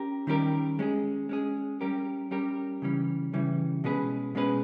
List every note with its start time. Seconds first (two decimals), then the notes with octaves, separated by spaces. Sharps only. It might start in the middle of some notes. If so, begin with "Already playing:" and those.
Already playing: C#4 G4 A#4
0.27 D#3 G3 C#4 G4 A#4
0.79 G#3 C#4 G#4
1.29 G#3 C#4 G#4
1.81 G3 C#4 G4 A#4
2.31 G3 C#4 G4 A#4
2.82 C#3 E3 G3 C#4
3.33 C#3 E3 G3 C#4
3.84 B2 G#3 C#4 G#4 B4
4.35 B2 G#3 C#4 G#4 B4